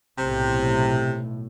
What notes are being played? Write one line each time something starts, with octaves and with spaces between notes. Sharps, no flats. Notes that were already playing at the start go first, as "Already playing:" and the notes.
B1 A2 C3